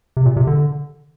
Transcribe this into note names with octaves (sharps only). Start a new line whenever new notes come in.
C3
A#2
C3
D3